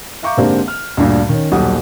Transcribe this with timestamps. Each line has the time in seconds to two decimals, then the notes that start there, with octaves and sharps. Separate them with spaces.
0.23 E5 F5 A#5 C#6 D6 G6
0.37 G#2 D3 A#3 C4 D4 G4
0.68 F6
0.97 D2 G2 A#2
1.29 D#3 C#4
1.52 D#1 B1 G4 F#5 D#6